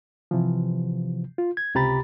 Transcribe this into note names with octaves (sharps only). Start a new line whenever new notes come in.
C3 E3 F3
F4
G#6
C#2 C3 G4 A#5 B5 A6